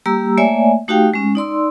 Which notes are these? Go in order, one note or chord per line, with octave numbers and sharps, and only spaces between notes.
G3 A#3 G4 A#5 E6
A3 A#3 C#5 D5 E5 G#5
A3 D#4 F#4 G4 F5 G5
G#3 C#4
D#4 D5 C6 E6